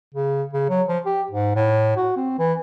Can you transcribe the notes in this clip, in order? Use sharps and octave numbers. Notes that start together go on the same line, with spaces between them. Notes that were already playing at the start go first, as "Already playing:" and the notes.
C#3
C#3
F#3
F3
G4
G#2
A2
F#4
C4
E3